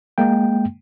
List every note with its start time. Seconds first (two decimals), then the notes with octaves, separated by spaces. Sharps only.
0.18 G#3 A#3 G5